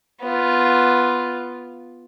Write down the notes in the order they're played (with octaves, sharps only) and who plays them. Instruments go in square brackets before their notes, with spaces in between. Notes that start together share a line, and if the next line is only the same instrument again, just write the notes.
[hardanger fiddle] B3 F4